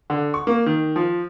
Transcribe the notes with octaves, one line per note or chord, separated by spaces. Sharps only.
D3
C#6
A#3
D#3
F3